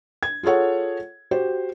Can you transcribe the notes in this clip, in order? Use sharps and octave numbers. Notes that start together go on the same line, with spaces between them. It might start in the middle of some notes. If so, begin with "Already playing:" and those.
G#6
F4 G#4 A4 C#5 F#5
F#4 G4 C5